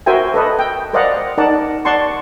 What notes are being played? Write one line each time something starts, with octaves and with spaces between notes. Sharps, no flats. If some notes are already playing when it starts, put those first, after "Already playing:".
F#4 A#4 C5 E5 G5 G#5
A4 B4 D#5
G5
A#4 C5 D5 D#5 F5 F#5
D#4 A#4 D5 F#5 A5
D5 F#5 A5 C6 C#6